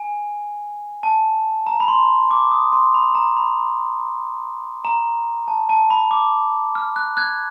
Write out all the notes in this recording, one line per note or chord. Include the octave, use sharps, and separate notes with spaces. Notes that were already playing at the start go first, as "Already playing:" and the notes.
Already playing: G#5
A5
A#5
B5
C6
D6
D#6
C6
B5
A#5
B5
A#5
A5
A5
B5
D6
F6
F#6
F#6 G#6